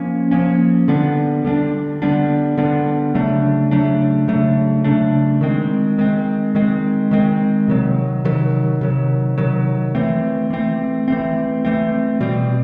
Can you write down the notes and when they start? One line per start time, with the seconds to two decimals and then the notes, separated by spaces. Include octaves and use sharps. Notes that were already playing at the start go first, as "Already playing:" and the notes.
Already playing: F3 A#3 C#4
0.31 F3 A#3 C#4
0.88 D3 G3 B3 D4
1.45 D3 G3 B3 D4
2.02 D3 G3 B3 D4
2.57 D3 G3 B3 D4
3.15 C#3 F#3 A3 D4
3.71 C#3 F#3 A3 D4
4.28 C#3 F#3 A3 D4
4.84 C#3 F#3 A3 D4
5.41 D#3 G#3 C4
5.98 D#3 G#3 C4
6.55 D#3 G#3 C4
7.11 D#3 G#3 C4
7.68 C3 D#3 F#3
8.25 C3 D#3 F#3
8.81 C3 D#3 F#3
9.38 C3 D#3 F#3
9.95 E3 A3 C4
10.50 E3 A3 C4
11.08 E3 A3 C4
11.65 E3 A3 C4
12.21 B2 G3 C4